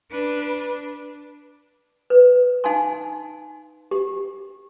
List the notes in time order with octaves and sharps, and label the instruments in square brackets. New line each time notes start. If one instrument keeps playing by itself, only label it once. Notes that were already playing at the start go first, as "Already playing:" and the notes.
[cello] D4 [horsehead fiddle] B4
[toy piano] B4
D#4 F5 G#5 A5 C6
G4